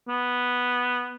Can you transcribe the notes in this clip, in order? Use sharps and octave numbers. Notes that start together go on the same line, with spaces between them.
B3